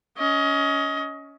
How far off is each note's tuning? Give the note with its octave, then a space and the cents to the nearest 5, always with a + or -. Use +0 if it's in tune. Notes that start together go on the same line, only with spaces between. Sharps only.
C#4 +20 D#5 +25